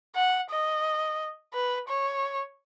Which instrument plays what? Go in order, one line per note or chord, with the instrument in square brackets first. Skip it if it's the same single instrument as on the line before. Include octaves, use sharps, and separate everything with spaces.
[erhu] F#5
D#5
B4
C#5